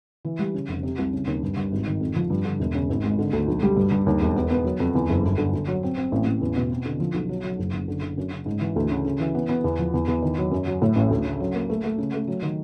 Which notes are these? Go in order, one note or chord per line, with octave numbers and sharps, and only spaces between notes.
E3
G3
C#3
F1
C3
C2
C#3
D#2
G2
G2
G#1
D#3
F2
F3
G2
D3
E1
C#3
G#1
G#3
D3
D2
B1
G3
G2
G2
D#2
E1
B3
B3
F#3
F2
E2
F#1
G1
D3
D3
F#3
C4
C4
A1
A1
E2
B2
C4
D3
F3
B1
F#3
F#3
F#1
F#1
D3
D3
F#2
C#3
G#2
E3
D2
C#3
C#3
E3
B3
B3
E2
F3
E2
E2
D#3
F#3
F#2
F#3
A2
A1
D2
C#3
F#3
A#3
A3
A3
C#3
A3
F#3
D#3